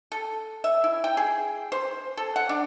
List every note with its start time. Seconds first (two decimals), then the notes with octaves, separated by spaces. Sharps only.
0.12 A4
0.64 E5
0.84 E4
1.04 G5
1.17 G#4
1.72 C5
2.17 A4
2.36 F#5
2.49 D4